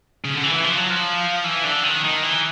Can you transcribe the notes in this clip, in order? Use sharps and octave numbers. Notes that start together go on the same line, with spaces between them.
C#3
D3
E3
E3
F3
F#3
F3
E3
D3
D#3
D#3
E3